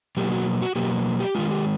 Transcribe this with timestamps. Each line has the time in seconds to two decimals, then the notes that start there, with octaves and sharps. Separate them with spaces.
0.17 B2 F#3 A#3 G4
0.32 F#4
0.62 F#4
0.76 B2 F#3 A#3 G4
1.20 G4
1.35 D#3 G#3 F4
1.51 G4